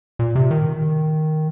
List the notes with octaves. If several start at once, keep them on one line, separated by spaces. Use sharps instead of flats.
A#2
C3
D#3